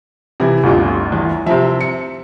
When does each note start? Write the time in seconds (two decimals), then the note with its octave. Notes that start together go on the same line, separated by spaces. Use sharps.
0.40 C3 E3 E4
0.63 G1 D2 G3 F4
1.12 E2
1.46 C3 F3 E5 A#5
1.81 C#7